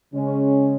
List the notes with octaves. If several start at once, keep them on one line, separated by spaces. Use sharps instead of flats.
C#3 G#3 C#4